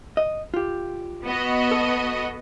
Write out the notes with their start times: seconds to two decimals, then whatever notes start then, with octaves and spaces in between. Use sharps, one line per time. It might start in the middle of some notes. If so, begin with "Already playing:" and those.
0.17 D#5
0.54 F4 G4
1.24 B3 F#4 D#5
1.71 A4